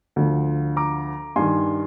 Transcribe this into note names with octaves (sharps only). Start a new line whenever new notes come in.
D2 D3 F3
A#5 D6
G2 D#3 G#5 C6